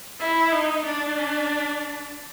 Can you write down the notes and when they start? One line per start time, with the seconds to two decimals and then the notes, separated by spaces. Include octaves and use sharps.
0.20 E4
0.52 D#4
0.86 D4